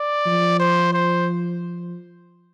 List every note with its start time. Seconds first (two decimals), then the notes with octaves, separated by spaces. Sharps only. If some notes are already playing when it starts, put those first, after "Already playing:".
Already playing: D5
0.27 F3
0.60 C5
0.93 C5